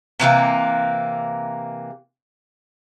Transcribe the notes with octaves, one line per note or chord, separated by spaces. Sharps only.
C3 E3 A3 A#3